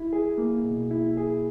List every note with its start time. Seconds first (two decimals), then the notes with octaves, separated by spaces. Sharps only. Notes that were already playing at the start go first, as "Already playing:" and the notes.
Already playing: E4
0.13 G#4
0.38 A#3
0.64 B2
0.91 E4
1.17 G#4